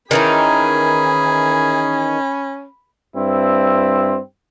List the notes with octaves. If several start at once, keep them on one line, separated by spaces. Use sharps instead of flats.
D#3 E3 C#4 D#4 G#4 B5
G2 C4 E4